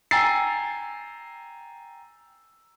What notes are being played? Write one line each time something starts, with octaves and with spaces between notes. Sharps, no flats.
G5 G#5 A#5 E6 A6 C7